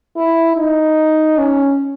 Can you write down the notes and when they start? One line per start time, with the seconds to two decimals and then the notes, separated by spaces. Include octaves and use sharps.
0.16 E4
0.56 D#4
1.37 C#4